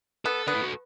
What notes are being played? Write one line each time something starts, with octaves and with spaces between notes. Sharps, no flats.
B3 A4
B3 D4
E4
F#4